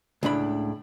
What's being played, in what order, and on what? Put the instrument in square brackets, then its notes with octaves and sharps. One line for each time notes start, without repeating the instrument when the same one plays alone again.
[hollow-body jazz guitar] C#2 A2 D4 B5